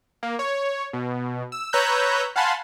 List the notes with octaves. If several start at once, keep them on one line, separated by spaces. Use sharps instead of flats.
A#3
C#5
B2
E6
B4 C#5 A#5 E6 F#6 G6
F5 F#5 G#5 A5 B5 C6